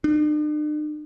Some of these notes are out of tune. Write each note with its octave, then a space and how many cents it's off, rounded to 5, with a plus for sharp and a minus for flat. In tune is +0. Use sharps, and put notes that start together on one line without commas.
D4 +45